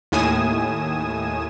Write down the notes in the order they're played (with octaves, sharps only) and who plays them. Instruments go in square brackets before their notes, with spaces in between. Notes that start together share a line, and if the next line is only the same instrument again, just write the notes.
[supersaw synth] D#2 A2 G#5 D#6 E7